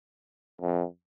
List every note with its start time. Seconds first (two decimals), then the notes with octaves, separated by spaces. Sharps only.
0.61 F2